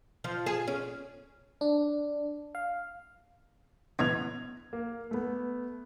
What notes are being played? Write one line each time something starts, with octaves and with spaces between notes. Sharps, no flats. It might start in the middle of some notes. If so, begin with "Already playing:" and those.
F3
G#4
C#4
D4
F5
F#2 B2 E3 G#6 F7
A#3
A3 B3